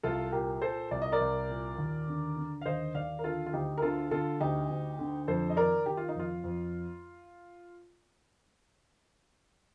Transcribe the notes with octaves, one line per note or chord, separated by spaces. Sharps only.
C2 F4 A4
A#2 G4 A#4
A#2 A4 C5
C2 D5
D#5
A#4 D5
C2
A#2
D#2
D3
D3
F5
D#2 C5 D#5
D#2 D5 F5
A#4
D3 F4 A4
F4
D2 D#4 G4
A#4
D3 F4 A4
D3 F4 A4
D2 D#4 G4
D2
D3
F2 A4 C5
D#5
D#3 A#4 D5
D#3 G4
F4
D#4
F2 F4
F2